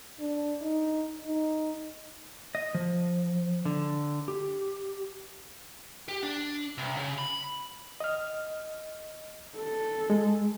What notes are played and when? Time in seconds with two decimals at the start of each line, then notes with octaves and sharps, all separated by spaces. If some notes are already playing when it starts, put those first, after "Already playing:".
0.20 D4
0.62 D#4
1.27 D#4
2.55 D#5
2.75 F3
3.65 D3
4.28 G4
6.08 G4
6.23 D4
6.78 C2
6.97 C#3
7.19 B5
8.00 D#5 F6
9.58 A4
10.10 G#3